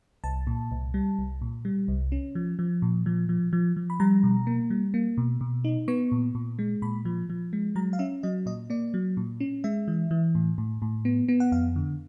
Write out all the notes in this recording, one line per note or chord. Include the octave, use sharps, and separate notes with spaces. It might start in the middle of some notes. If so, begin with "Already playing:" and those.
C2 A5
A#2
C2
G3
C2
A#2
G3
C2
C#4
F3
F3
A#2
F3
F3
F3
F3
B5
G3 A#5
B2
A#3
G3
A#3
B2
B2
D#4
B3 C#6
A#2
A#2
G#3
A#2 B5
F3
F3
G#3
F#3 A#5
F5
C#4 E5
F#3 D#5
A#2 D#5
A#3 D5
F#3
A#2
C#4
G#3 E5
E3
E3
A2
A2
A2
B3
B3
F#5
F2 F5
D3